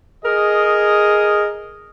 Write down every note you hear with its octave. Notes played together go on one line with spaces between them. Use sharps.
G#4 A#4 D#5